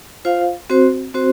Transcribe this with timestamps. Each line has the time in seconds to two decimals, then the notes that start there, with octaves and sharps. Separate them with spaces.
0.25 F4 C5 F5
0.70 C4 F#4 C5
1.14 C4 F#4 C5